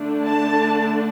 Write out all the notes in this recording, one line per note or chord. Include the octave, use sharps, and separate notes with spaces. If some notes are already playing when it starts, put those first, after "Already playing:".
Already playing: D3 A3 D4
A5